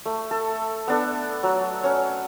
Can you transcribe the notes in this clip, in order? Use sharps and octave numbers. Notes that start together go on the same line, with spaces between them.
A3
A4
B3 D4 A4
F#3
C#4 C#5